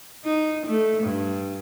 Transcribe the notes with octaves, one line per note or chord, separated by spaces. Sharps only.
D#4
A3
G2